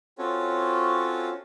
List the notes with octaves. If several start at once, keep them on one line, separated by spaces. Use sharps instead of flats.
C4 C#4 F4 F#4 A4 C#5